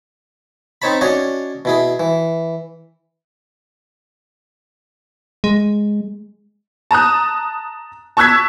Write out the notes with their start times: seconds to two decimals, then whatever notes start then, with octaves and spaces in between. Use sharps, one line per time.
0.82 C4 D#4 C#5 A5 B5
1.01 C#4 D4 F#4 C#5 D#5
1.65 B2 E4 G#4
2.00 E3
5.44 G#3
6.91 A5 A#5 D#6 F#6
8.17 A5 C#6 E6 F#6 G#6 B6